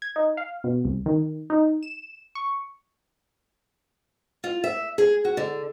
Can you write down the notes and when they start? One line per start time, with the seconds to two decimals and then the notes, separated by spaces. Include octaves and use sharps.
0.02 G#6
0.16 D#4
0.37 F5
0.64 B2
0.85 C2
1.06 D#3
1.50 D#4
1.83 E7
2.35 C#6
4.44 F4
4.64 E5
4.98 G#4
5.25 F#4
5.37 D3